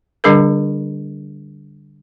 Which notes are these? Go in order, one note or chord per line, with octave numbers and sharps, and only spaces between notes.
D3 G3 D4 G#4 A#4